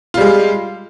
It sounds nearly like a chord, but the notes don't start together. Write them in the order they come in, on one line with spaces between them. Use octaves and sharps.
F4 G3 G#3